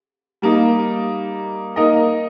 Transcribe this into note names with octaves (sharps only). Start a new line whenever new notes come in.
G3 A#3 D#4
A#3 D#4 A#4 D#5